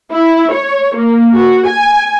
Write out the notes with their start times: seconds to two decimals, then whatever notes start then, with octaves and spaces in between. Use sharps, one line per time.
0.11 E4
0.52 C#5
0.96 A#3
1.35 F#4
1.67 G#5